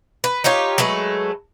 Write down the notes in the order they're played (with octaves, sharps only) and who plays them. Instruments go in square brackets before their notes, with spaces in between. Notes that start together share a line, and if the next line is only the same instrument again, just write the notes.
[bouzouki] B4
D#4 F4 G4 C#5
F#3 G#3 A3 B4